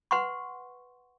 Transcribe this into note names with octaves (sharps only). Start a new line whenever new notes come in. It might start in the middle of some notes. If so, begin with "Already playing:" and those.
B4 F#5 C6 C#6